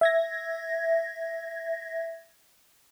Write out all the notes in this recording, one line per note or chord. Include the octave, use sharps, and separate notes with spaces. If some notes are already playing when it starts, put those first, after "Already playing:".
E5 G#6 A#6